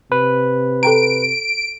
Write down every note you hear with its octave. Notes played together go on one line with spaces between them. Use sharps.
C3 B4
A4 G5 A#5 D7